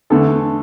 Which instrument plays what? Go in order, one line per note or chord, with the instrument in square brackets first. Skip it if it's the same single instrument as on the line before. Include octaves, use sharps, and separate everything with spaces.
[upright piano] E2 D3 A3 A4